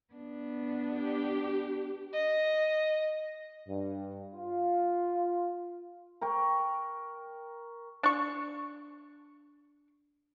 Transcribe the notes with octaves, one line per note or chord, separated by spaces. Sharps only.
B3 D4
G4
D#5
G2
F4
A#4 G5 C#6
D4 C#6